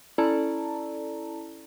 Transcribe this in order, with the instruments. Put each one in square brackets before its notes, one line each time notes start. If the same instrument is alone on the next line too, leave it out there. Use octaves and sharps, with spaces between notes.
[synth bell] C#4 E4 A4 D5 A5 A#5